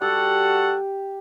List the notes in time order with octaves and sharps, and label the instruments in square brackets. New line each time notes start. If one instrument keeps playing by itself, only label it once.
[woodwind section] G3 F#4 A4 [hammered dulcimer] G4 [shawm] F#5